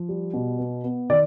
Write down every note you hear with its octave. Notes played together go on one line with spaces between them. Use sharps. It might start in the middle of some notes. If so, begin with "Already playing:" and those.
Already playing: F3
G3
B2
B3
B3
D#3 D5